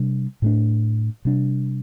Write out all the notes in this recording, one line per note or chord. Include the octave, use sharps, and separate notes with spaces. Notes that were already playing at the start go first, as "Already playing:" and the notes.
Already playing: C3 G3 D4
A2 A3 D4
C3 G3 D4